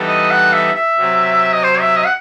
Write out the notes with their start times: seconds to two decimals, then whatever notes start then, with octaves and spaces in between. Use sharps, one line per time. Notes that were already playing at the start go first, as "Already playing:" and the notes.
Already playing: E3 G3 B3 D#4 A4
0.08 D#5
0.31 F#5
0.53 E5
0.75 E5
0.97 C3 F#3 C4
1.52 D#5
1.63 C5
1.80 E5
1.97 D#5
2.05 F#5